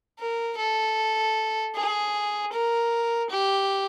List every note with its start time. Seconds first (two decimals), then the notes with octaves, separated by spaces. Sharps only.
0.19 A#4
0.57 A4
1.75 G#4
2.52 A#4
3.30 G4